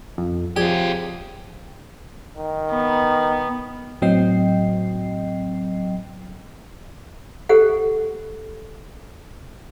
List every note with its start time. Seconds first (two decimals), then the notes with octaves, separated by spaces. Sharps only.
0.18 F2
0.56 F2 C3 F3 C#4 G4 G#4 D5 D#7
2.34 D#3
2.71 B3
4.02 A2 F#3 C4 D#5 G5 C7
7.49 G4 A4 C5 F#5